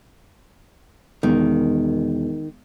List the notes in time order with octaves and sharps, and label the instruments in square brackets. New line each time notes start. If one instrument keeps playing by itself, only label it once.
[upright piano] E1 [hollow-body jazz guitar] D#3